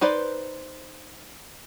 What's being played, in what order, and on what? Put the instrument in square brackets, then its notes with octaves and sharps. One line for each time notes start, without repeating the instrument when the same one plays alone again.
[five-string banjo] D#4 B4 C5 D5